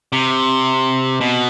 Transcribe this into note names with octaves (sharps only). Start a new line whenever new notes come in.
C3
B2